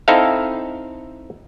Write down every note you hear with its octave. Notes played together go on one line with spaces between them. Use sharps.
C4 D#4 E4 A4 E5 F5